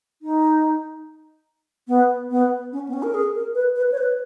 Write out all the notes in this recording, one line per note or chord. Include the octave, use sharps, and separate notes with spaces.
D#4
B3
B3
C#4
B3
C#4
A#4
G#4
A#4
B4
B4
C#5
B4